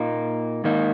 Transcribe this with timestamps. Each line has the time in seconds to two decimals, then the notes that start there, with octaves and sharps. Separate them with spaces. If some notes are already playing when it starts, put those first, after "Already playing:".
Already playing: A#2 A#3 D#4
0.64 G#2 D#3 A#3 D#4